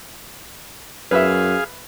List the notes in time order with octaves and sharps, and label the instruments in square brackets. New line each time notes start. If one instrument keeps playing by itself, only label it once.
[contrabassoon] F#2 [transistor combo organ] G#4 F5 [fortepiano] B4 E5